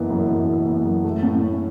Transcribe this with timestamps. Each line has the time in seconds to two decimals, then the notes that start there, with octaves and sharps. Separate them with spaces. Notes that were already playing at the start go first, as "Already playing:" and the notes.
Already playing: F#1 E3 B3
0.10 F#2
0.29 E3
0.48 F#1
0.67 B3
0.85 F#2
1.04 A3
1.23 A2
1.41 C#4